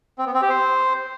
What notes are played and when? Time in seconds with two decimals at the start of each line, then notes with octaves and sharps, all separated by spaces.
0.18 C4
0.26 B3
0.34 C4
0.42 G4
0.49 C5